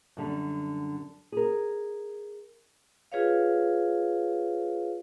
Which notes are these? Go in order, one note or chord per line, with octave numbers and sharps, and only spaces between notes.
F#2 D3 G3
G#4 A#4
F4 G#4 B4 C#5 F5